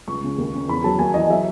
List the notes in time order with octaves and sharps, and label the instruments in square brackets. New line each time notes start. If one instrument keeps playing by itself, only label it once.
[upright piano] C#2 C#6
C#3
D#2
C#3
E2 B5
F#3 A5
D#2 G#5
E3 D#5
F#3 E5